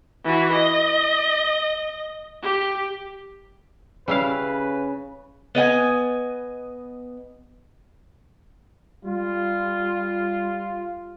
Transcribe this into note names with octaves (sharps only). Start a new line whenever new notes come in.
E3 F#4
D#5
G4
C#3 G3 E4 B4 F5
B3 D#5 G5 G#5
G3 F4